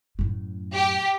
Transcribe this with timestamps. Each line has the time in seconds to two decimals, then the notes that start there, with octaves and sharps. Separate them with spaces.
0.19 F#2 A2
0.74 G4